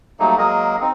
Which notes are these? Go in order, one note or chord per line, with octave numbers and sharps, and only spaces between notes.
F#3 G3 A3 A#3 D#4
F#3 G#3 A#3 G#4 A#4 D#5
C4 D#4